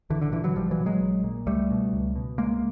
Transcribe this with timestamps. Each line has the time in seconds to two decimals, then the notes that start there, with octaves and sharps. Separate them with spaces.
0.10 A#1 D3 E3
0.21 D3
0.32 A#2 D3 E3
0.44 E3 F#3
0.55 A#1 F3 G3
0.71 E3 F#3
0.79 A#2
0.86 F#3 G#3
1.01 A#1
1.24 A#2
1.47 C#2 G3 A3
1.70 B2
1.93 C#2
2.16 B2
2.38 C#2 G#3 A#3